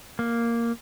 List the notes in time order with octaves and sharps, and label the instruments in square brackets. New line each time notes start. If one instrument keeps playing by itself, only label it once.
[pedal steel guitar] A#3